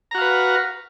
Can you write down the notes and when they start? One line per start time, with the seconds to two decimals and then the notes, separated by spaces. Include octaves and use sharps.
0.11 A#5
0.15 F#4
0.18 F5
0.21 B4